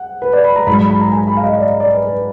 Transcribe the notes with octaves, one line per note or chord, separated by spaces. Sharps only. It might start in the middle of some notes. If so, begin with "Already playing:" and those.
Already playing: F#5
B4
D5
B5
A#5
G#2 F#3 B5
B5
B5
A#5
G#5
B5
F5
D#5
D5
D5
B4
B4